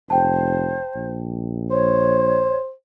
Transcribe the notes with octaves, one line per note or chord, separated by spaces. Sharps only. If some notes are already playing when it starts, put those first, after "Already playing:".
F1 C5 G5 A5
A#1
C5 C#5